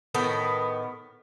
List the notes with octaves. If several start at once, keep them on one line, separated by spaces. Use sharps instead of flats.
A2 D#3 B3